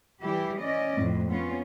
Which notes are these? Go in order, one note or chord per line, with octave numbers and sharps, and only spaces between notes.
E3 G3 E4 G4
C#4 D5 D#5
F2 A2
B3 C#4 F4